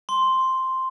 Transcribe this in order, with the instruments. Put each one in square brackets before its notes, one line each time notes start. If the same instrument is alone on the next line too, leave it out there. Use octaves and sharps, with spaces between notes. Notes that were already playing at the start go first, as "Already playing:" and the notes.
[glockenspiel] C6